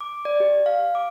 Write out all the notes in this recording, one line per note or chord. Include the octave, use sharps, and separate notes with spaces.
D6
D5
G4
F5
D6